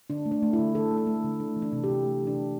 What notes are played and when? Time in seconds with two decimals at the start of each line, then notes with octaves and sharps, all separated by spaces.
0.10 D3 D4
0.26 A3
0.32 D4
0.43 A3
0.53 E4
0.59 D3
0.75 D3 A4
0.91 A3
0.97 A4
1.07 A3
1.24 D3
1.40 A3 D4
1.56 E3
1.62 D4
1.72 C3
1.84 G4
1.89 C3
2.05 A3
2.22 E3
2.27 D4
2.38 C3